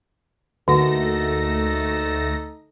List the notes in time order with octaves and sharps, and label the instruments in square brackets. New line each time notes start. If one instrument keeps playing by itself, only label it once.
[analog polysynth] D2 A3 A#6 [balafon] D3 [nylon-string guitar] A#3 F#4 [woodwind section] D#4 A4